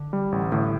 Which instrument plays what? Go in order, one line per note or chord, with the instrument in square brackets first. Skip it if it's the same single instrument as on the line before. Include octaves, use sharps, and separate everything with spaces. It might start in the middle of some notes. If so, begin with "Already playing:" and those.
Already playing: [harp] D3
[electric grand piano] G3
A1
[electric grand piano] A2 [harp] D3